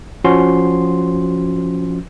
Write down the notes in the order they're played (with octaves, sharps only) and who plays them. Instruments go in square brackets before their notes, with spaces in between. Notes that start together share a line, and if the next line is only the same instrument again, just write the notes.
[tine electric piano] F3 C#4 F#4 C6